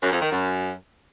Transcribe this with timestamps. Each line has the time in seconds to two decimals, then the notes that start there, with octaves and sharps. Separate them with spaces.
0.02 F#2
0.12 F2
0.22 D#3
0.31 F#2